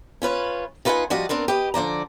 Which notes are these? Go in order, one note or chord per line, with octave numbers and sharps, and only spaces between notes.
C#4 F4 B4 C#5
D#4 F4 B4 F5 F#5 G#5
F3 G3 F#4 D5 D#5
B3 C4 D4 A#4
G4 B4 D#5
D3 F3 D5 A#5